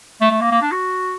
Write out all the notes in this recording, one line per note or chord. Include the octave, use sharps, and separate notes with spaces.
A3
A3
A#3
A#3
D4
F#4